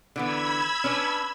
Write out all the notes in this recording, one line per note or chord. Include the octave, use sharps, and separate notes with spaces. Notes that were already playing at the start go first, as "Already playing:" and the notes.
D3 E3 B3 B5 E6 G#6
C#4 D4 B4